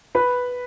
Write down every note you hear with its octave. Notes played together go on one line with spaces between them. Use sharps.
B4 B5